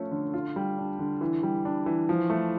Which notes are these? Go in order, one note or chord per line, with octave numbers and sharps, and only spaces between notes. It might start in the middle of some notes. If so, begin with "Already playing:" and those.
Already playing: F3 A3 C#4 F4
D3
F4
G3
D4
D3
E3
G3
D4
E3
F3
A3